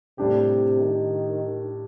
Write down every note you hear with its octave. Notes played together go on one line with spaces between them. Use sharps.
A2 C3 G3 D4 G4
D#3